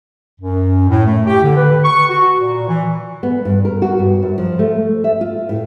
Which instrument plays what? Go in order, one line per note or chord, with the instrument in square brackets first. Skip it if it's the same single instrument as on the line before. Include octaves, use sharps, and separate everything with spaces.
[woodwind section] F#2
A2
A3
G4
D3
B4
C#6
F#4
A#2
E3
[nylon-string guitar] B3
G2
A#4
F#4
G2
F#2
F3
A3
E5
F4
A2